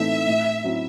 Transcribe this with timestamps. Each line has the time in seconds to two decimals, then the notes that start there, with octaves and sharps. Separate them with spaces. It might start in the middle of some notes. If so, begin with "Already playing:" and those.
Already playing: A2 E3 A3 C4 D#4 E5
0.27 A2
0.64 F#3 C4 E4